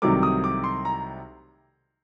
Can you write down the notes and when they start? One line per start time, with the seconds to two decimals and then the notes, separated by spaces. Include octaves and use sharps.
0.02 C2 C3 D#3 F#3 A3 D6
0.23 D#6
0.44 D6
0.64 C6
0.85 A#5